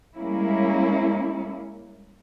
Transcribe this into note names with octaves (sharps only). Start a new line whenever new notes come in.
G3 G#3 A#3 C#4 E4